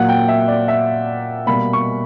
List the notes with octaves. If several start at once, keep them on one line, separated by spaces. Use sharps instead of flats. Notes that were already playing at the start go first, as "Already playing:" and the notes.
Already playing: A#2 F#3 A#3 F#5
G5
E5
D5
E5
B2 G3 A#3 B5
C#6